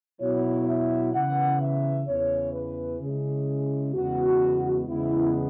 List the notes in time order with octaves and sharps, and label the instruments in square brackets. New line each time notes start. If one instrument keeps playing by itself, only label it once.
[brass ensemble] B2 F#3 E4 C#5
E5
C#3 E3 B3 F#5
E5
E2 C#3 E3 C#5
B4
C#3 G#3 C#4 E4 G#4
E2 C#3 G#3 B3 F#4
E2 C#3 G#3 B3 E4